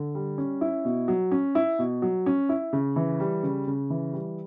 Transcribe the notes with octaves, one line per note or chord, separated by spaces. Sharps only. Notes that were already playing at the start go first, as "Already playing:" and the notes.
Already playing: D3
G3
C#4
E4
B2
F#3
C#4
E4
B2
F#3
C#4
E4
C#3
E3
G3
C#3
C#3
E3
G3